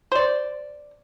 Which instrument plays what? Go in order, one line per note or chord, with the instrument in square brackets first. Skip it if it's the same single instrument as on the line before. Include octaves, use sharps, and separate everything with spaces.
[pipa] C5 D5